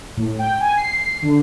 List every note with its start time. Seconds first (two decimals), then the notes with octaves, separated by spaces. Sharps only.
0.17 A2
0.39 G5
0.61 G#5
0.77 C7
1.22 D3